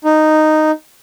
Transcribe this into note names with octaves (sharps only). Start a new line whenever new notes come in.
D#4